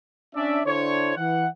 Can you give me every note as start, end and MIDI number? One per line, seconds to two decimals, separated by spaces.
0.35 0.60 61
0.35 0.60 62
0.35 0.60 74
0.35 0.60 76
0.65 1.15 50
0.65 1.15 62
0.65 1.15 64
0.65 1.15 72
0.65 1.15 73
1.17 1.47 52
1.17 1.47 78